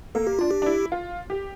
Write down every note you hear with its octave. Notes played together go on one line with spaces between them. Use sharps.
A#3 A4
G4
D4 F4
G4
D4
E4
F4
G4